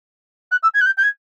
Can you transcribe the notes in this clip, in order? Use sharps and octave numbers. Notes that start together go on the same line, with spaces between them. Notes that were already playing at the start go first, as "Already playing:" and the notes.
F#6
E6
G#6
F#6
G6
G6
G#6